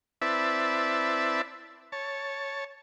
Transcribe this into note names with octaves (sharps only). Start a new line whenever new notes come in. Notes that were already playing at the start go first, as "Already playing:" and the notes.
C4 E4 B4 D5 E5 A5
C#5 A5